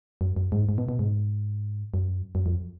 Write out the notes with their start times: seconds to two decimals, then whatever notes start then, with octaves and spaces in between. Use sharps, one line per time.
0.21 F#2
0.37 F#2
0.52 G#2
0.69 G#2
0.78 B2
0.89 B2
0.99 G#2
1.94 F#2
2.35 F#2
2.46 F2